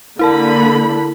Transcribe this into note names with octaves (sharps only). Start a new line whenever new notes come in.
D3 A#3 E4 A#4 A5 B5